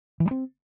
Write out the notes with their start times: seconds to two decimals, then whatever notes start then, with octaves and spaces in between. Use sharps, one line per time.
0.20 E3
0.26 G3
0.31 C4